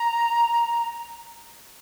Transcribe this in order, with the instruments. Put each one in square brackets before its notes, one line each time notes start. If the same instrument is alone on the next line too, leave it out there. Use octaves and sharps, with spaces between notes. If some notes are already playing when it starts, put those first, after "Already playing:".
Already playing: [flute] A#5